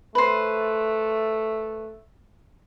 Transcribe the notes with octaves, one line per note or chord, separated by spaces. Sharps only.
A3 B4 C5